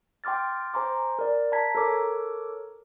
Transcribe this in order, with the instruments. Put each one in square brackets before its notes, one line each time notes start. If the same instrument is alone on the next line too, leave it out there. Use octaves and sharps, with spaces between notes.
[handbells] G5 C6 D6 F6 A6
C5 G#5 A#5 C6 D6
A#4 D5
A5 A#5 G#6 B6
A4 A#4 C#5 D6